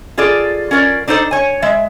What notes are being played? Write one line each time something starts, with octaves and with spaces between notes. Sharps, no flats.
F4 G#4 A4 D5
C#4 F4 A#4 D5
D4 D#4 A4 C5 D5
C#5 G#5
G#3 E5